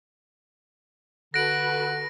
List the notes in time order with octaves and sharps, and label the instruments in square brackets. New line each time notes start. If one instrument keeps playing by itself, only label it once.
[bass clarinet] D3 [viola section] F#4 A4 B4 [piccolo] F#6 [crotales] A#6 D7